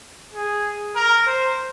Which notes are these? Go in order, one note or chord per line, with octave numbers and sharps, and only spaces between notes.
G#4
A#4
C5